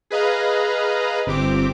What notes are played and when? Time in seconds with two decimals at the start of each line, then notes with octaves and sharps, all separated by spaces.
0.11 G#4 B4 D#5 F5 A#5
1.26 G1 C4 G4 D6